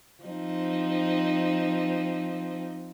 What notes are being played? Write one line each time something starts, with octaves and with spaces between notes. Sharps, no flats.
F3 C4 D#4